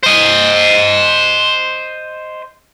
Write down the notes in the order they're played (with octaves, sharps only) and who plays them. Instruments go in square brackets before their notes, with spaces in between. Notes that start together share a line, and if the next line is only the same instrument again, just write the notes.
[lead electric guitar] C5 D#5